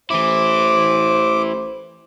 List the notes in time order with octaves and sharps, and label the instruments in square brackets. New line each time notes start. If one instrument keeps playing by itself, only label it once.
[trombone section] A1 C5 [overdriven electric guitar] E3 E4 [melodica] D6